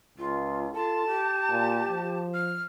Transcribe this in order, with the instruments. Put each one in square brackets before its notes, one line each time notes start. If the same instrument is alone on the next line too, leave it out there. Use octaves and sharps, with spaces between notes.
[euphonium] C#2 [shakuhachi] F4
[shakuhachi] F4 [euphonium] A4 [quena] A5
[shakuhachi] G4
[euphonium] A#2
F3
[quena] F6